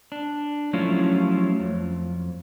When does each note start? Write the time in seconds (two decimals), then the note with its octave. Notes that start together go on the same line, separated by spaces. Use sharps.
0.12 D4
0.73 F3 F#3 A3 C#4 E4 F4
1.60 F2